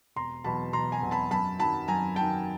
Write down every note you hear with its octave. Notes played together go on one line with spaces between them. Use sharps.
E1 A#5 C6
E2 B2 F#3 A5 B5
E1 A#5 C6
G#5 A#5
E2 B2 F#3
A5 B5
F#2 A5 B5
D#3 F#3 A5 B5
F#2 G#5 A#5
D#3 F#3 G5 A5